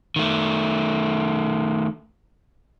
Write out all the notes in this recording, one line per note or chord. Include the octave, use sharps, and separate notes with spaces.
D#3 A3